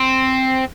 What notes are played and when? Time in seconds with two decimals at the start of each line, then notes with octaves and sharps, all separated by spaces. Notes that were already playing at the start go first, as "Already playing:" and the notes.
Already playing: C4